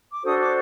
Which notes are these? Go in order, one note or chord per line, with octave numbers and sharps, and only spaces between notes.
D6
D4 F#4 A4 C5 D#6
D6